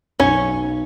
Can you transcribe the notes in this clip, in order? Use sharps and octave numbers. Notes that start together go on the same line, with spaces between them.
B1 C#4 C#5